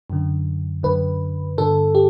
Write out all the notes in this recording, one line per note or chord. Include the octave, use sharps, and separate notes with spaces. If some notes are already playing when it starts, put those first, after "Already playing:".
F#2 D3
F#2 D3 B4
G2 D3 A4
G4